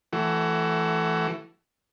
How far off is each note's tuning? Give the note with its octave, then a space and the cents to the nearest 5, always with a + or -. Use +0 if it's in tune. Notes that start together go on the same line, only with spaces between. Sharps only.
E3 +15 A3 -5 F#4 +25